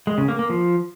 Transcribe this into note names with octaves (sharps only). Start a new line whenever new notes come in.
G#3
C#3
A#3
A#3
F3